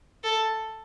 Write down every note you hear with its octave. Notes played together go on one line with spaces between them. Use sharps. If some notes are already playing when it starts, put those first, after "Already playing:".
A4